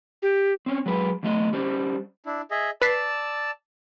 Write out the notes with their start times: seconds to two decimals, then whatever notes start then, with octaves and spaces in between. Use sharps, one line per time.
0.23 G4
0.66 C4 C#4
0.86 F#3 G#3 B4
1.23 E2 A3 D#5
1.53 G3 C#4 C5
2.26 D4 E4
2.51 G#4 D#5 E5
2.82 B4 D5 A5 E6 B6 C7